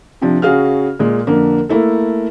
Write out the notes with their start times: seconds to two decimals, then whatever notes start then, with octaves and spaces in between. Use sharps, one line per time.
0.22 C3 F3 D4
0.42 C#3 F#4 G#4 F5 F6
0.99 A#2 G#3
1.27 F2 D3 A#3
1.69 A3 A#3 E4 A4